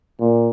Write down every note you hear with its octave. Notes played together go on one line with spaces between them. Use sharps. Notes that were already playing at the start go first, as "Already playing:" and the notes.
A#2